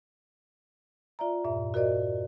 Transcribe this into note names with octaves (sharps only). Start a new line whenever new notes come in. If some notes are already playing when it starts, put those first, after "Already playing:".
F4 D5 E5 A#5
E2 G2 A#2 E5
F#4 A#4 C5 D5 D#5